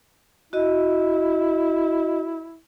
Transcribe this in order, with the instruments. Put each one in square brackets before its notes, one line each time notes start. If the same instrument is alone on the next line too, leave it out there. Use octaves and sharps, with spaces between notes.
[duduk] E4 [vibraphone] F#4 D#5